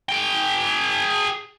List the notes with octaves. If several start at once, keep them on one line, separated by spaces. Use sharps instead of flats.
G#4 G5